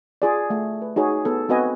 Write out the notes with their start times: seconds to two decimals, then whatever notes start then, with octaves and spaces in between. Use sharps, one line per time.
0.22 F4 G#4 D5
0.50 A3
0.82 B4
0.96 D#4 F#4 G#4 C#5
1.25 B3 A4
1.49 B3 C4 F#4 B4 D#5 G#5